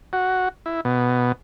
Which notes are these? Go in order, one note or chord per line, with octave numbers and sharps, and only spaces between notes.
F#4
E4
B2